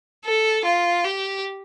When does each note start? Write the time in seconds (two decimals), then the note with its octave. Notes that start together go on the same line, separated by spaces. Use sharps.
0.25 A4
0.65 F4
1.04 G4